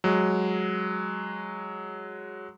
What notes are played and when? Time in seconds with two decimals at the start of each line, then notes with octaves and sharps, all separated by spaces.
0.04 F#3 G#3